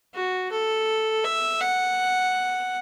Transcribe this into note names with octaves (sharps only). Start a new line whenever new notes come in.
F#4
A4
E5
F#5